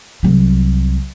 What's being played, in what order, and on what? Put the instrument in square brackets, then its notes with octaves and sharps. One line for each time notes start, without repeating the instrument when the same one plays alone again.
[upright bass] C2 F#3